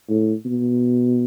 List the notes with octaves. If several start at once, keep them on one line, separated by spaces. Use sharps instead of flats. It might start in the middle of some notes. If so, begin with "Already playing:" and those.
A2
B2